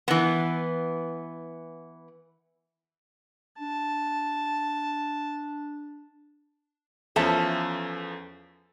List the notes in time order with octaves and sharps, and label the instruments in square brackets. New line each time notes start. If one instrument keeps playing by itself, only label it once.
[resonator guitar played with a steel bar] E3 B3
[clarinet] D4 [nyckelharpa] A5
[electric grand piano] E2 F3 C#4 [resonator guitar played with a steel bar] A4 E5 A5